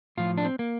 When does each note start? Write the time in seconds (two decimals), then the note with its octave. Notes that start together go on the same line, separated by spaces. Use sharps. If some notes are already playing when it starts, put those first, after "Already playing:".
0.17 A2 F3 F4
0.37 D4
0.45 C4
0.59 A#3